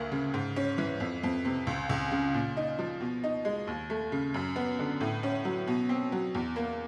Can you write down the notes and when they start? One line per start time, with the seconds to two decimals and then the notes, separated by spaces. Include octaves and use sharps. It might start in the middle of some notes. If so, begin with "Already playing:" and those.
Already playing: D2 A#3
0.12 C#3
0.34 G#2
0.56 C#4
0.78 E3
1.00 F2
1.23 F2
1.45 C3
1.67 C#2
1.89 C#2
2.11 C#3
2.34 A#2
2.57 D#4
2.79 F3
3.00 B2
3.23 D#4
3.45 G#3
3.67 D#2
3.90 A3
4.12 C#3
4.34 F#2
4.56 B3
4.79 D3
5.01 A2
5.23 C#4
5.45 F#3
5.67 B2
5.89 C4
6.12 F#3
6.35 E2
6.56 A#3